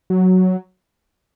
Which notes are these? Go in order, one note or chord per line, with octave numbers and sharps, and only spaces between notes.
F#3